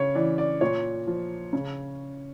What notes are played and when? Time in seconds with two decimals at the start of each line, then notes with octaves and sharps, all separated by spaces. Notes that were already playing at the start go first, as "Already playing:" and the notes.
Already playing: C#3 C#5
0.15 E3 D5
0.38 D5
0.61 A#2 C#5
1.07 F3
1.53 C#3